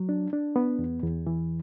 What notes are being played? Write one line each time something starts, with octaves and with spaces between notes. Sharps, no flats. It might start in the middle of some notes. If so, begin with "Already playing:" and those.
Already playing: F#3
D4
D4
B3
E2
E2
E3